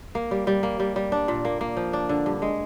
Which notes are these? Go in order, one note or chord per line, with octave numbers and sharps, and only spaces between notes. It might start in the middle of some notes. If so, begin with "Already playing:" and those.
A#3
G3
G3
A#3
G3
G3
D4
A#2
A#3
A#3
F3
D4
D3
G2
G#3